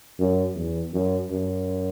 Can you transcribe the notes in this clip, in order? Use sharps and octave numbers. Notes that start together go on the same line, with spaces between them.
F#2
E2
F#2
F#2